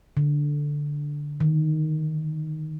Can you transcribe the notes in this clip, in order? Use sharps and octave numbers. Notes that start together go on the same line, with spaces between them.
D3
D#3